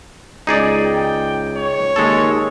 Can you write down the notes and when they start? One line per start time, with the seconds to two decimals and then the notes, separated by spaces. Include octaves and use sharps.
0.47 C#2 D#4 G#4 D5
0.86 G5
1.58 C#5
1.96 D#2 G#3 A4